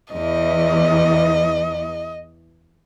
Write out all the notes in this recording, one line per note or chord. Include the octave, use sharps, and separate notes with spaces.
E2 E3 D#5